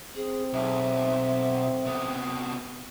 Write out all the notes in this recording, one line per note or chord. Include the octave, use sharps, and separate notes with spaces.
C4 G#4
B1 E5
C3 B3